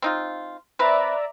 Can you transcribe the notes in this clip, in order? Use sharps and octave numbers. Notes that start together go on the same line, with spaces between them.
C4 D#4 F4
C4 B4 D5 E5 A#5